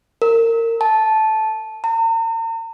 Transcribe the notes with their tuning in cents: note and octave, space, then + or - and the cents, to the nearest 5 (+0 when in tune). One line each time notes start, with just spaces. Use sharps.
A#4 -25
A5 -10
A#5 -45